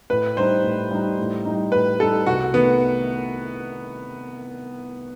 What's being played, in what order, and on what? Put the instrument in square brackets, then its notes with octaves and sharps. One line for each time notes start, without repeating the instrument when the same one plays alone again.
[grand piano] A2 [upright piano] B4
[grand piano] G3 D#4 [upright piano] C5
[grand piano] A2
G3 D#4
A2
G3 D#4
[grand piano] A2 [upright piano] B4
[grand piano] G3 D#4 [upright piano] A4
[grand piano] C2 [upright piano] F#4
[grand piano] D#3 A3 [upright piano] B3